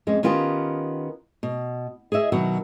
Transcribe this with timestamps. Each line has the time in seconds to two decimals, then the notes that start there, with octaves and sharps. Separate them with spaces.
0.07 F2 G#3 C#4
0.23 D#3 B3 C#4 F4 G4 A#4
1.43 B2
2.12 G#4 C#5 D#5 E5
2.32 B2 D#3 F#3 F#4